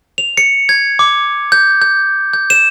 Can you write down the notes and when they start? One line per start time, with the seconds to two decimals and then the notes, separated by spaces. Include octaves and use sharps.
0.18 F7
0.37 C#7
0.69 G#6
0.99 D6
1.52 G6
1.81 G6
2.33 G6
2.50 E7